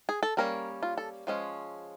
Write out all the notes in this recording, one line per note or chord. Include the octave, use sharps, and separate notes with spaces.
G#4
A4
G3 A#3 C#4 A#4
F4
A4
F3 G#3 C#4